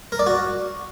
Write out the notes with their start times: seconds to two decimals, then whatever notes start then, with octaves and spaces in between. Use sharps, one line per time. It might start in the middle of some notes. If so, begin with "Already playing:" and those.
0.12 A#4
0.19 D5
0.27 F#4